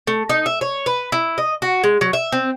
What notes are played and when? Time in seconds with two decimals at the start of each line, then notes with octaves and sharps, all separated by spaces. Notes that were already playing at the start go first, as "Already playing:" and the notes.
0.07 A3
0.29 D#4
0.46 E5
0.61 C#5
0.86 B4
1.12 E4
1.38 D#5
1.62 F#4
1.84 G#3
2.01 F#3
2.13 E5
2.32 C4